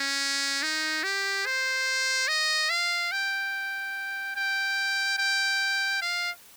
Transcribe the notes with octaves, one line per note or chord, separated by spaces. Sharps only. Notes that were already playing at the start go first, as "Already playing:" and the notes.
Already playing: C#4
D#4
G4
C5
D#5
F5
G5
G5
G5
F5